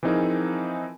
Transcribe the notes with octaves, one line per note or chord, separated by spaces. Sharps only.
E3 F3 C4 D#4 G#4 A#4